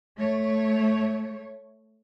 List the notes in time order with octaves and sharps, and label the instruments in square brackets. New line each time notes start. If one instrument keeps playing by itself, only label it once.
[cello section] A3 C#5